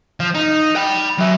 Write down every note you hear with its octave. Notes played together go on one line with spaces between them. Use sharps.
F3
D#4
G5 B5
F#3 E5